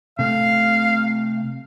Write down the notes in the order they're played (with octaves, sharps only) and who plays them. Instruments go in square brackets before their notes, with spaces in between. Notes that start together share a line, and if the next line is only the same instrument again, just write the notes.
[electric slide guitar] C3 A3 [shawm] F5